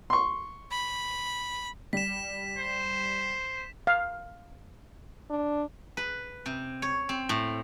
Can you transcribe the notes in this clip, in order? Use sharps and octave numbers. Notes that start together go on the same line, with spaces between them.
C6 C#6
B5
G3 B6 E7
C5
F5
D4
B4
C3
C#5
C4
A2